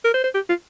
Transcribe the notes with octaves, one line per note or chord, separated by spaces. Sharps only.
A#4
C5
C5
G4
F4